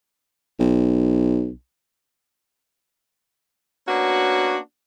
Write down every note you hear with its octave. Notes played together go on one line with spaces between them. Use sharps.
B1
A#3 B3 C#4 D4 F#4